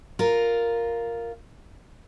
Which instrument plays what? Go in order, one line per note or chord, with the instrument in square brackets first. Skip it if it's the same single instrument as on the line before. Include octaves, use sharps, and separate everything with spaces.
[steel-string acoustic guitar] F4 A#4